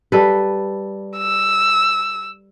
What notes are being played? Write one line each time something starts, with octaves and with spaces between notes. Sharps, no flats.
G3 A4 B4
E6